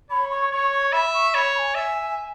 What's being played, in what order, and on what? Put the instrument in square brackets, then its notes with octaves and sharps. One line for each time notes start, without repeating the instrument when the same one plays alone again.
[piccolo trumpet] C#5 [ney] B5
[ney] C#6
[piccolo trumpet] C#5 [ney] C#6
[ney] C#6
[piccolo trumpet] E5 [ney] B5
[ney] C#6
[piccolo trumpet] C#5 [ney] B5
[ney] B5
G#5
[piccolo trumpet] E5